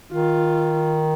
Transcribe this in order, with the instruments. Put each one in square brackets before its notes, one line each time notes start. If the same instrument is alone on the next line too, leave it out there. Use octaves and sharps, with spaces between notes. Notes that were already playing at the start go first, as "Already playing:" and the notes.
[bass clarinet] D#3 [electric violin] F4